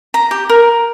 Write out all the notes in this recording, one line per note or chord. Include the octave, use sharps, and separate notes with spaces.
A#5
G4
A#4